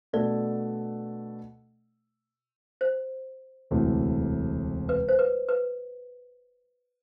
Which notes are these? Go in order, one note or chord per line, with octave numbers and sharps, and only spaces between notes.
B2 A3 D4 A4 D5
C5
E1 D2 C3 E3 A3
B4
C5
B4
B4